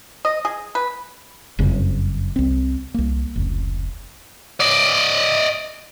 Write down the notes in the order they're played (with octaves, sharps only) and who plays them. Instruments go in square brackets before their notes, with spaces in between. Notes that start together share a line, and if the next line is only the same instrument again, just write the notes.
[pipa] D#5
G#4
B4
[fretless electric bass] F#1 F2 C#3 G3
C2 C4
C2 A#3
F1 C#2
[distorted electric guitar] D5 D#5